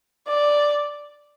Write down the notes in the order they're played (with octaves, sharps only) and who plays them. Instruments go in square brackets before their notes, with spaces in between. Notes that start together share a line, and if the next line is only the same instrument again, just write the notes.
[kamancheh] D5